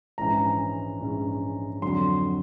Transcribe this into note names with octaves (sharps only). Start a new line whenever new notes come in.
A#1 G#2 E3 G#3 C#4 A#5
A#1 G#2 E3 G#3 C#4
F2 D3 F#3 C6